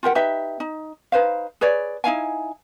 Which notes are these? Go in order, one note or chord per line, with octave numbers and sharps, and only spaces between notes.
F4 G4 A#4 F#5
D#4 G4 B4 E5
D#4
D#4 B4 C5 F5
G#4 B4 C#5 D5
D#4 E4 F5 G#5